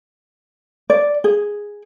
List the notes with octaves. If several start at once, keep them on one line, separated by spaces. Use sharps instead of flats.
D5
G#4